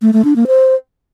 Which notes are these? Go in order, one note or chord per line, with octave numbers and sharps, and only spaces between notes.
A3
A3
D4
A#3
C5